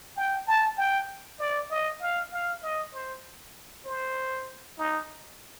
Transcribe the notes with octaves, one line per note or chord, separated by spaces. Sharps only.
G5
A5
G5
D5
D#5
F5
F5
D#5
C5
C5
D#4